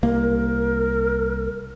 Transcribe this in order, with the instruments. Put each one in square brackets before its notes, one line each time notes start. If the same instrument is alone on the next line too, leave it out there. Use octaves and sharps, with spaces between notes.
[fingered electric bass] C2 A#3 [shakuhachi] A#4